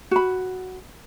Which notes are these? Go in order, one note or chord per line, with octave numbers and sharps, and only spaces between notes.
F#4 B5